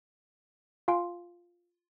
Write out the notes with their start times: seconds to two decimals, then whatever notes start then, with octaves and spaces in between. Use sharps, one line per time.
0.88 F4 F5 G#5 C6 D7